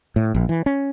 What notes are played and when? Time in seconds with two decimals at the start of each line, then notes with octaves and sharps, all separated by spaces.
0.16 A2
0.35 A#1
0.49 E3
0.66 C#4